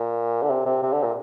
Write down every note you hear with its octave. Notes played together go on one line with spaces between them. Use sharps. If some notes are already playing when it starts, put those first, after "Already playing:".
Already playing: A#2
D3
C3
C3
C3
D3
A#2